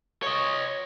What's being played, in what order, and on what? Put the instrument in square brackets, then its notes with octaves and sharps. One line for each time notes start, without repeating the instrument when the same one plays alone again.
[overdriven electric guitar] C#5 D#5